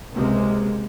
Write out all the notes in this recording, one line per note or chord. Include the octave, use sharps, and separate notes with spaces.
C#2 C3 G#3 A#3